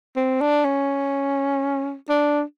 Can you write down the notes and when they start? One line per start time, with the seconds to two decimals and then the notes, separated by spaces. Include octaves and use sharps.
0.16 C4
0.41 D4
0.65 C#4
2.10 D4